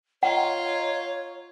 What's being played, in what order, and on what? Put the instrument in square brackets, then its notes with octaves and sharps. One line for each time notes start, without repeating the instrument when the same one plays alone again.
[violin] F4 [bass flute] C#5 [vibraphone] D#5 A#5 [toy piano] F#5